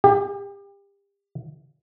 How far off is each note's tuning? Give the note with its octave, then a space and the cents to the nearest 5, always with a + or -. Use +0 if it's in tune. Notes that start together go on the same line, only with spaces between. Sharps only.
G4 +30